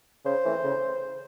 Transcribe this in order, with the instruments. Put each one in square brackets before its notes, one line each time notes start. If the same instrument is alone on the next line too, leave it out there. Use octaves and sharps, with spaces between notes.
[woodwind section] C#3 C5
E3 A3 C4
C#3